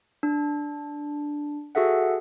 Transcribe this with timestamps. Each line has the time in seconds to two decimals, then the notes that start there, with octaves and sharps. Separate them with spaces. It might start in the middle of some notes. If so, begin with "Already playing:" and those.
0.23 D4
1.75 F#4 G#4 A4 E5 F#5